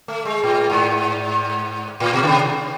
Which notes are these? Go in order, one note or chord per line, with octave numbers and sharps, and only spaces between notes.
A3
G#3
A2
G#2
A2
B2
D3
C3